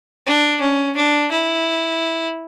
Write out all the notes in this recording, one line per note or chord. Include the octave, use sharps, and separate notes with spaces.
D4
C#4
D4
E4